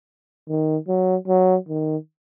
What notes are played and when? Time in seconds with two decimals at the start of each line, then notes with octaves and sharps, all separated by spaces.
0.49 D#3
0.88 F#3
1.28 F#3
1.69 D#3